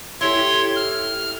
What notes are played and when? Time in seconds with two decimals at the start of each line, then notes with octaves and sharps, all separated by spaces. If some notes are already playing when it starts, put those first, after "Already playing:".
0.21 E4 G4 A4 C#5 C6
0.76 F6